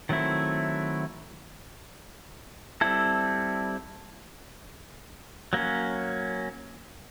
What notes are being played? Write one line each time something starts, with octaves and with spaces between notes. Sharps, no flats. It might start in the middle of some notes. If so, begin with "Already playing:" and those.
D#3 F#3 A3 C4 E4
G3 C4 E4 A4
F#3 A#3 C#4